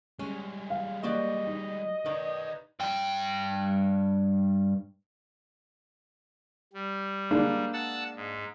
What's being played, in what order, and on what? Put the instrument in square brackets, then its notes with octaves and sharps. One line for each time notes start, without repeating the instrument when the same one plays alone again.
[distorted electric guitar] G3 G#3 [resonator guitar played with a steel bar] C#4
[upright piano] F5
[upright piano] A#3 [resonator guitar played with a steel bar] F#4 G4 D5 [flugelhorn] D#5
[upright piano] D#4
[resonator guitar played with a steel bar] D#3 [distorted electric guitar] B4 D5
[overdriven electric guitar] G2 G5
[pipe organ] G3
[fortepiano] G#3 A#3 D4
[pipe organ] F#5 A5 E6
G#2